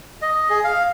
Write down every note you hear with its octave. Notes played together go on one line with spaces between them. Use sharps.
D#5
G#4
F5